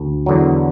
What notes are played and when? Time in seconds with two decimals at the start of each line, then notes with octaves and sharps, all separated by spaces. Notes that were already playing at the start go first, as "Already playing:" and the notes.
Already playing: D2
0.26 E2 D3 F#3